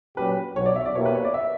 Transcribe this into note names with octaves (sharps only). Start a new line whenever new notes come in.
A#2 F#3 C#4 G4 B4
B1 B2 F#3 C#5
D5
E5
D5
B2 A#3 E4 G4 C#5
B4
C#5
D5
E5